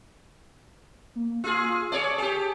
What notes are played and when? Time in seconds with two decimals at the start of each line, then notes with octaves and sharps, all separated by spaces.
1.15 A#3
1.44 F4 G#4 E6
1.92 G#4 C#5 D5 A5
2.18 G4 G#4